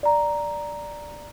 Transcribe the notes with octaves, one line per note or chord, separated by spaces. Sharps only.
D5 A#5